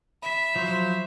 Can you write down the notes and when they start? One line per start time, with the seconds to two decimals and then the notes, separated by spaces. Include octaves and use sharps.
0.22 E5 B5 B6
0.56 F3 F#3 C5